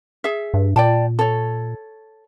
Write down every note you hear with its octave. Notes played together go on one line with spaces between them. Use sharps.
G#4 E5
G2
A#2 D5 G5 A5
A4 C#5